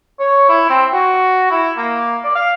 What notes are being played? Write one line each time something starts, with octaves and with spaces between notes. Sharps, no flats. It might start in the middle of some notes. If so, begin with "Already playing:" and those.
C#5
E4
C4
F#4
E4
A#3
D5
F5